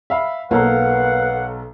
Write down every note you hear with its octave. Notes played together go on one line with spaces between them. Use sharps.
E5 F5 B5
B1 A#3 A4 B4 F5 F#5 A#5